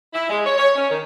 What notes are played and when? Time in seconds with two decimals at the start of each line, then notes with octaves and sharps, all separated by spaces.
0.14 E4
0.29 G#3
0.46 C#5
0.57 C#5
0.76 C#4
0.89 D#3